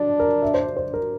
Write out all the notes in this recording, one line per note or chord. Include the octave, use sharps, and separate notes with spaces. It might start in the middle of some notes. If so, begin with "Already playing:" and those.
Already playing: D4 A5
A#4
E5
C5
D5
C5
A#4